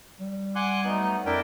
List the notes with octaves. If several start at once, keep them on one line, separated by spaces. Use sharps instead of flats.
G3
F#5 G#5 C6 D6 F#6
F#3 A3 B3 D#4
F2 D4 E4 A#4 G5